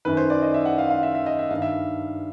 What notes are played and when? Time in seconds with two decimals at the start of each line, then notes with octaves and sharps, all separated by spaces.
0.05 F#2 D#3 B4
0.17 C5
0.30 D5
0.42 D#5
0.54 E5
0.65 F#5
0.78 F5
0.90 F5
1.03 E5
1.15 E5
1.26 D#5
1.39 E5
1.51 G2 D#3 F5
1.62 E5